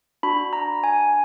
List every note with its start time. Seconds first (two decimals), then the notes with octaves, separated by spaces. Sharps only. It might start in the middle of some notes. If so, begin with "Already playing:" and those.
0.23 D4 F#4 B5
0.53 A#5
0.84 G#5